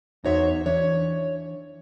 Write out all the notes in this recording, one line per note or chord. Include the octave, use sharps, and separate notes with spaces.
E2 D#4 F#4 C5 C#5 E5
E3 D4 C#5